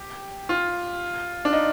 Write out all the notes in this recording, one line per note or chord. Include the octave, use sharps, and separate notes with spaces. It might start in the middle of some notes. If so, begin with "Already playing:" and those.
Already playing: G4
F4
D4
D#4